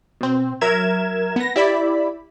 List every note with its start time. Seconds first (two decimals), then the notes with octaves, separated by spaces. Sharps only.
0.21 B2 C4
0.61 F#3 A#4 E5 G#6 E7
1.36 B3 A#6
1.56 E4 G4 D5 E5 B5